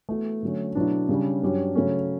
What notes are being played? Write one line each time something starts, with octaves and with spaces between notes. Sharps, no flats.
E3 A3 B3 F#4 A4
D3 F#3 C#4
B2 F#3 A3 D4 E4
C#3 G3 C#4
G2 F#3 C#4 G4
C#3 F#3 A3 C#4